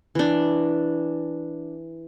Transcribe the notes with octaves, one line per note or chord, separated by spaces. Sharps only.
E3 D4